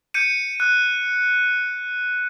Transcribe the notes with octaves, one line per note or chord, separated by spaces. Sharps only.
G6 C#7 D#7
F#6